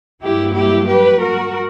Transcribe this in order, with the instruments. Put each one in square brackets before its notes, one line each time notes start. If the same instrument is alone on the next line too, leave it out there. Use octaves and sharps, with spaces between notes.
[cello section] G2 F#3 A#3 E4 G4
E4 G4
G4 B4
F#4 A#4